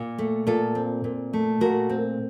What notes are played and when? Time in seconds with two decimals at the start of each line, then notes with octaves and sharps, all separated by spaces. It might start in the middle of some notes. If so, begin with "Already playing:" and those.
Already playing: A#2
0.18 A3
0.47 A#2 F4 A4
0.75 C4
1.04 A#2
1.33 A3
1.61 A#2 F#4 A#4
1.89 C4